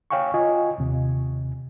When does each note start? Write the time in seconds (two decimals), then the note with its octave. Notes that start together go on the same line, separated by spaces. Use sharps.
0.10 C#5 F5 G5 G#5 C#6
0.34 F4 D#5 G#5
0.78 D#2 C3